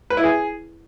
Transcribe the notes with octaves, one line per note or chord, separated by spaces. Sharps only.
B4
E4
G#4